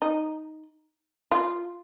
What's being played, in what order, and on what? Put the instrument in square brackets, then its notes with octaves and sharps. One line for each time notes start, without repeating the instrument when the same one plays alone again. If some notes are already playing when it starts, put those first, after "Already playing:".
[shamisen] D#4
F4